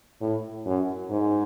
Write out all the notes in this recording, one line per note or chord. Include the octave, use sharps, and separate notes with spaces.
A2
F#2
G#2